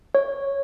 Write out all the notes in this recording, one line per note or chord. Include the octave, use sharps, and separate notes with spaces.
C#5